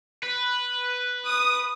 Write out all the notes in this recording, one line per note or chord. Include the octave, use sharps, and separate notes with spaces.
B4
D#6